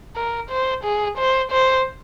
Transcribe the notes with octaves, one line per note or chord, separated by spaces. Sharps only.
A#4
C5
G#4
C5
C5